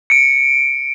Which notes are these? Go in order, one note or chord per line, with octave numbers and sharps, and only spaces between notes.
C#7 D7